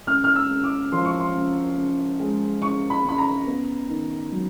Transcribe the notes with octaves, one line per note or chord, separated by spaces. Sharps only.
C#3 F6
F6
E6
C#3
D6
F3 C6
C#6
C6
C#3
C#3
G#3
C#3 C#6
B5
C#3 B5
A#5
B3
D#3
F#3